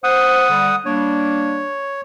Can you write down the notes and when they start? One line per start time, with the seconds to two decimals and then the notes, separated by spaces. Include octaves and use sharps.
0.04 C5 F#5 D#6
0.50 D3 G3
0.86 G3 A#3 D4 C#5